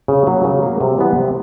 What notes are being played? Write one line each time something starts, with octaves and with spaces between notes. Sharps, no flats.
C#3
F#3 A#3
C#3
F#3 A#3
C3
E3 G3 B3
C3